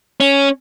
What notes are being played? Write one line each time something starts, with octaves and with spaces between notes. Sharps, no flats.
C#4